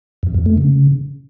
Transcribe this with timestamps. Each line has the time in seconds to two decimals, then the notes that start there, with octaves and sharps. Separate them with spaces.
0.23 F2
0.34 F2
0.46 A3
0.57 C#3